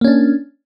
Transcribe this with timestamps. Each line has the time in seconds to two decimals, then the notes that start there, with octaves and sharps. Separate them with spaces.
0.01 A#3
0.04 C#4
0.08 D4